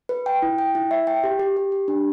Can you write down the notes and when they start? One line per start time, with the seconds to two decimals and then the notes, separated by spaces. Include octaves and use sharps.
0.09 B4
0.26 G5
0.42 E4
0.58 G5
0.75 E4
0.91 E5
1.07 G5
1.24 G4
1.39 G4
1.57 G4
1.72 G4
1.88 D4